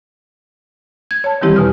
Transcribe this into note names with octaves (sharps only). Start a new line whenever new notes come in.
G#6
C#5 A5
D#3 E3 G3 C4 E4 G4
E2 B2 F6